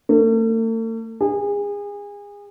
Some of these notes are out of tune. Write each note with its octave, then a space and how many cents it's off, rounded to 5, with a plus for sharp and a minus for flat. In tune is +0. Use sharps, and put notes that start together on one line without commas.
A3 +45
G#4 -30